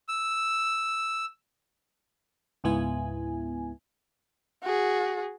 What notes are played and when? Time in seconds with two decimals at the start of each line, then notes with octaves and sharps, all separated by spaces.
0.09 E6
2.64 C#2 G#2 B3 E4 G#5
4.63 F#4 G#4